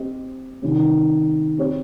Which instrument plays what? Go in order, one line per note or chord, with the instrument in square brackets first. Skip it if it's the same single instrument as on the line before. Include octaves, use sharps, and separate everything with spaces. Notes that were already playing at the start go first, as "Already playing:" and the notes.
Already playing: [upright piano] C4 G4 D#5
C3 D#3 G3 C#4
C4 G4 C#5